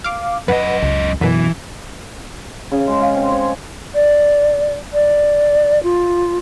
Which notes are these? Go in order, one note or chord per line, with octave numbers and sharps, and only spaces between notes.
F5 D6
F#2 B4 D#5 F#5
C#2
F#2 B2 E3
C#3
G#3
F5
C4
C#5
D5
D5
F4